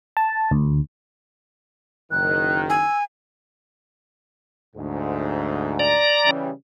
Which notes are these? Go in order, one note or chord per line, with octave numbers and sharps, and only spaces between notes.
A5
D2
F#1 D#3 F#6
G#5 E6
D2 G#2
D5 A#5
C#3 E3 G3